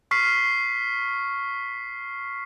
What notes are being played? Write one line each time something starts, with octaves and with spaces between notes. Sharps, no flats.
C#6 F6 B6 C7